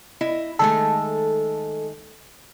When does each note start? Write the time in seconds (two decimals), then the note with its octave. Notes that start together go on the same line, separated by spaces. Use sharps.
0.21 E4 D#5
0.59 D#3 G#3 A3 A4